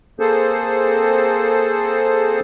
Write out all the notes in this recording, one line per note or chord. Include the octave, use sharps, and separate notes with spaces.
A#3 C4 G#4 A4 C5